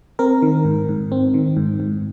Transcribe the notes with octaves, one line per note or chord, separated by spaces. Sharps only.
C4 A#4
D#3
G#2
G#2
C4
D#3
G#2
G#2